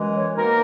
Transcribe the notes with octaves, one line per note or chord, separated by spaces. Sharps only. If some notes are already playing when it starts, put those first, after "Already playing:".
Already playing: F#2 E3 G#3
C#5
B2 A#3 D#4 A#4